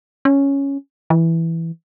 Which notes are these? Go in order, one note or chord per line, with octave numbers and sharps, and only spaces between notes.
C#4
E3